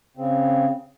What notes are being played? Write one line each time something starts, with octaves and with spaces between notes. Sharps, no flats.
C#3 C4